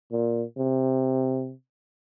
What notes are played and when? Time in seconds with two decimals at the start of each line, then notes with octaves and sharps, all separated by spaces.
0.12 A#2
0.57 C3